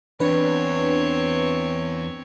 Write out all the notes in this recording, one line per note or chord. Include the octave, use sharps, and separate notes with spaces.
E2 C4 D4 B4 C#5